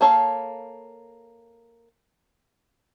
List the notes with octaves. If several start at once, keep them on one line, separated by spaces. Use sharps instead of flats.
A#3 A4 C#5 F5